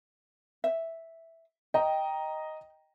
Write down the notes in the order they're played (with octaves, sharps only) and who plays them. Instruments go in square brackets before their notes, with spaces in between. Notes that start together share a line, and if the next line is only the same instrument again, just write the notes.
[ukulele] E5
[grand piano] D#5 A#5 [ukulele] G5